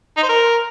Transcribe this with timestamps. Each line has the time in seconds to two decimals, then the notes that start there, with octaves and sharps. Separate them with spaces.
0.17 D#4
0.23 C5
0.29 A#4